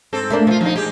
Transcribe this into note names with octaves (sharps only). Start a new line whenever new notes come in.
G#2 C4 A4
A3 A#3 D4
F3 C#4 F4
D#2 F3 D#4
G#3 G4